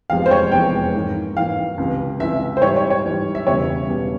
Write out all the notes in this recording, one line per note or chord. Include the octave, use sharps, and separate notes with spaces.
F1 E2 C3 F3 G#3 F5
C5
C#5
F1 E2 C3 F3 G#3 G5
G#2 E3 A#3
G#2 E3 A#3 F5
C#2 C3 E3
C#2 C3 E3 E5
C5
G#2 E3 G3 C#5
C#5
C#5
G#2 E3 G3
E5
E1 E2 C#3 G3 C#5
E1 E2 C#3 G3